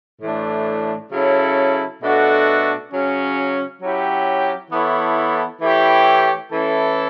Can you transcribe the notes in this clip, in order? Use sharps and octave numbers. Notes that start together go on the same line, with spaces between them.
A2 E3 A3 D4
C#3 F#3 C#4 E4 A4
B2 A3 D4 F#4 A4
C#3 F#3 C#4
F#3 C#4 E4 G4
E3 B3 E4 A4 C#5
E3 A3 E4 G4 C#5
E3 A3 C#4 E4 A4